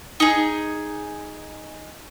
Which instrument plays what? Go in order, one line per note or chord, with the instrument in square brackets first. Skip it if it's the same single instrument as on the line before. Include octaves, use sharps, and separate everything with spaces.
[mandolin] D#4 G#4